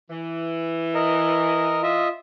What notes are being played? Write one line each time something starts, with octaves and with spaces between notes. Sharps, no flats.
E3
A#4 D#5
F4 D#5 E5